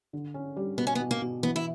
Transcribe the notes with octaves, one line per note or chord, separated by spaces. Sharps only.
D3
C#4
G3
B2 B3
C#4
B3
B2
A#3
B2
E3 B3
E4